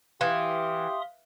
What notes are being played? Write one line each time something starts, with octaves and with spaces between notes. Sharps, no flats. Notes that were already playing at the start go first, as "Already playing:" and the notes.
E3 G4 E5 F5 C6 D#6